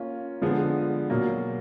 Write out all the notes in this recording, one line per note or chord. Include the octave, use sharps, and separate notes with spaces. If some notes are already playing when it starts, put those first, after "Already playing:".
Already playing: A#3 C#4 F4
D3 F3 G#3 B3
B2 F#3 A#3